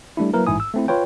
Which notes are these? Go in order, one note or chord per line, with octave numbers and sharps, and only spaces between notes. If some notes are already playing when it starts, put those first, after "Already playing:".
G3 A3 D4 E4
F#3 A#3 E4 A#4 B4
A1 G#2 E4 G#5 D#6
E6
A3 C4 E4
F4 B4 C#5 G5